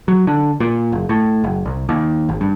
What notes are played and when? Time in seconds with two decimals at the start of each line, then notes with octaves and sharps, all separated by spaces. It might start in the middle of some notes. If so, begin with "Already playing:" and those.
0.08 F#3
0.27 D3
0.60 A#2
0.92 F#1
1.09 A2
1.44 F#1
1.65 C2
1.89 D#2
2.29 G#1
2.41 G2